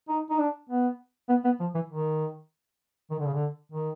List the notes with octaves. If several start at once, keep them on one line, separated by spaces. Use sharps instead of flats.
D#4
D#4
D4
B3
B3
B3
F3
E3
D#3
D#3
D3
C#3
D3
D#3